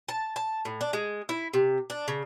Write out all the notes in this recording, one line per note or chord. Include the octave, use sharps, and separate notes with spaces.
A5
A5
A2
D4
G#3
E4
C3
D4
C#3